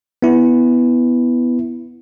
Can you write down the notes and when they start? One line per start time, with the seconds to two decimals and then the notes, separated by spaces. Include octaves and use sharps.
0.22 B3 E4